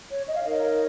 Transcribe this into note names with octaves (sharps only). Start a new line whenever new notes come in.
C#5
D#5
F5
D#4 A#4 C#5 D#5